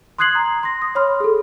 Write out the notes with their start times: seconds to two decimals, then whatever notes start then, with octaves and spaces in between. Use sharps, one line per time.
0.18 C6 D#6 F#6 G#6 C7 F#7
0.35 A#5
0.63 C6 A#6
0.82 D#6
0.95 C#5 B5 C6 F6
1.20 G#4 A4